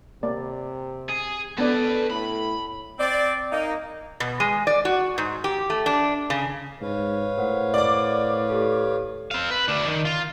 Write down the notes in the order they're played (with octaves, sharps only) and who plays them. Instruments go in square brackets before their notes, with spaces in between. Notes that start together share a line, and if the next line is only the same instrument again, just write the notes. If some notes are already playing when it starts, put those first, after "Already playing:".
[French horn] C3 [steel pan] A#3 D5
[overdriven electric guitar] G#4
[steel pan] B3 D4 D5 [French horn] A4 [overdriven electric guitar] B4 A5
[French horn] A2 [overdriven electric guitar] B5
[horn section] C4 D5
A#3 D#4
[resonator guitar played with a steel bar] B2
G#3
D5
F#4
G#2
G4
A3
D4
C#3
[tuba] G#2 [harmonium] B4 C#5 F5
[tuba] A2 [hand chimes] A#4 C5 F#5
[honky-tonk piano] D5 D6
[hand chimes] G4 A4
[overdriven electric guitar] C4 F5
B4
D2 D4
D#3
F4